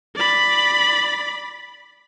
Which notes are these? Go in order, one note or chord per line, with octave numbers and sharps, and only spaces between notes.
D5 B5